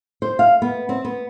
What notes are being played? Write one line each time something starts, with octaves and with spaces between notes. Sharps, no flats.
C5
F5
B3
C4
B3